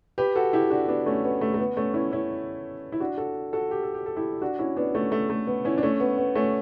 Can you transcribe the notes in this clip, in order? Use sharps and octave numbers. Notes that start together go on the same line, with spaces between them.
G4 B4
F#4 A4
E4 G4
D4 F#4
B3 D4
A3 C#4
B3
A3
A3
B3
A3 C#4
C#4 E4
C#4 E4
E4
D4 F#4
F#4 A4
F#4 A4
G4
A4
G4
A4
E4 G4
D4 F#4
C#4 E4
B3 D4
A3 C#4
A3
A3
B3
C#4 E4
D4
A3 C#4
B3
B3
A3 C#4